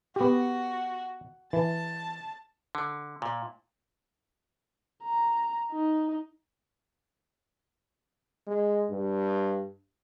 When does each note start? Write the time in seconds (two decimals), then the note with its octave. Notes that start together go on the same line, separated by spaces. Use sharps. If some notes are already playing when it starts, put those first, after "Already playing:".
0.16 B3 F#4 G4
1.53 E3 A5
2.75 D3
3.22 A#2
5.04 A#5
5.72 D#4
8.47 G#3
8.90 G2